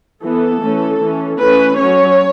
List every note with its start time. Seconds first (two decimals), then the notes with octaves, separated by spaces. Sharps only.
0.22 E3 B3 A4
0.60 E3 A3 C#4
0.99 E3 C#4
1.38 E3 A3 C#4 B4
1.76 F#3 C#4 C#5